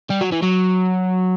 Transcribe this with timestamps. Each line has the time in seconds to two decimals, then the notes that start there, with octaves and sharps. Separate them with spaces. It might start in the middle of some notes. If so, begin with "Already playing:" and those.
0.10 G3
0.21 F#3
0.32 E3
0.43 F#3